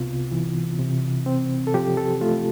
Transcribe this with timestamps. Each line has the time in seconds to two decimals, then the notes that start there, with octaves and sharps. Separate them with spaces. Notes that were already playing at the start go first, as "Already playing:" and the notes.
Already playing: C2 C3 B3 F4
0.32 E3
0.79 C3
1.26 C4
1.67 A4
1.74 F3 G4
1.97 A4
2.21 A3 F4